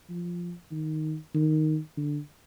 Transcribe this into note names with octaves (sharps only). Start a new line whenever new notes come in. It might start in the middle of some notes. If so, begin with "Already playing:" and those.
F3
D#3
D#3
D3